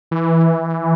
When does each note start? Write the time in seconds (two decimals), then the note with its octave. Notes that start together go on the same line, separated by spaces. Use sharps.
0.11 E3